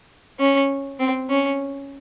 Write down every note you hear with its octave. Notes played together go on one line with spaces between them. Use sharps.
C#4
C4
C#4